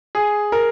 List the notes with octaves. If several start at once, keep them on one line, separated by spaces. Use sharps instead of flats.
G#4
A#4